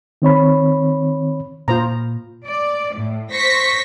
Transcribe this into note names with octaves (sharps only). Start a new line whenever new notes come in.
D#3 C4 C#5 B5
A#2 F4 C5 A#5
D5
A2
C5 C#6 A#6 B6